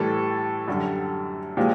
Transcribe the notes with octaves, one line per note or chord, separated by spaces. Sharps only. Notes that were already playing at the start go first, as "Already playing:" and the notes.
Already playing: A2 E3 G3 A4
F#2 D3 G3
A#2 F3 G#3 G4